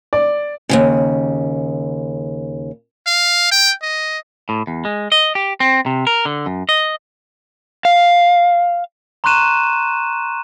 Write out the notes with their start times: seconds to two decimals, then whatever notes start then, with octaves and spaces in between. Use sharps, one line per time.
0.13 D5
0.69 D#2 G#2 C#3
3.07 F5
3.51 G5
3.82 D#5
4.49 A2
4.67 E2
4.85 G#3
5.12 D#5
5.35 G4
5.60 C4
5.86 C3
6.07 A#4
6.25 D3
6.46 F#2
6.69 D#5
7.85 F5
9.24 A#5 C6 C#6 F#6 D#7 E7